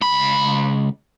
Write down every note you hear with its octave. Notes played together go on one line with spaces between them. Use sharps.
C#2 B5